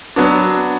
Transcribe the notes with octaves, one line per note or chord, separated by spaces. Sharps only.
F#3 B3 D4